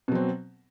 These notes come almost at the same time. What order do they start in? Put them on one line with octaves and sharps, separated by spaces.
B2 F#3 C4